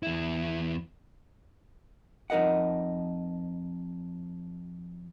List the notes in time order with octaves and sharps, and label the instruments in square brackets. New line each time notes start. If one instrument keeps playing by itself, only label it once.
[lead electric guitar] E2 E4
[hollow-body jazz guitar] F2 D#4 A#4 D#5 F#5